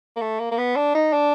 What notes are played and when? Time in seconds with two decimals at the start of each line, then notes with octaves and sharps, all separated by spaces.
0.16 A#3
0.21 A3
0.39 A#3
0.52 A#3
0.58 B3
0.76 D4
0.95 D#4
1.13 D4